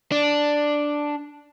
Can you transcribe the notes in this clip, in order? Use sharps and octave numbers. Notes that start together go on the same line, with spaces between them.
D4